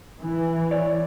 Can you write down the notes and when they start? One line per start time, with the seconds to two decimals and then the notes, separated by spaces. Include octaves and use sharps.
0.21 E3
0.71 C#5 D5